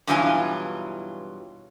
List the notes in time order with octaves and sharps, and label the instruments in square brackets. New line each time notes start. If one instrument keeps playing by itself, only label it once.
[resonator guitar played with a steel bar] G2 B2 E3 F#3 F4 G#5